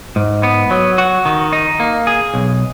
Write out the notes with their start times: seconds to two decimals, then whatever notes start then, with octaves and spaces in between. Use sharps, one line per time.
0.16 G#2
0.43 B3
0.71 F#3
0.98 F#4
1.25 D#3
1.53 D#4
1.80 A#3
2.07 G#4
2.34 B1